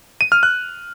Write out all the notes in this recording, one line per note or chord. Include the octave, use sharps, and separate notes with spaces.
D#7
F6
F#6